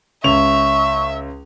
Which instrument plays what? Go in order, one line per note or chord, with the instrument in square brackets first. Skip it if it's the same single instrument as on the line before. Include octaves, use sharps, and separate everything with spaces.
[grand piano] C#2 C#4 F7 [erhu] E5 [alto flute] C#6